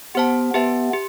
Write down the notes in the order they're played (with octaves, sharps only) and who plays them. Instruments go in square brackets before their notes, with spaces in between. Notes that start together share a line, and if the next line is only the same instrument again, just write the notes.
[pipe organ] B3 [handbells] G4 C5 F#5 A5
[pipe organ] B3 [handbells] G4 B4 E5 A5
[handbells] G4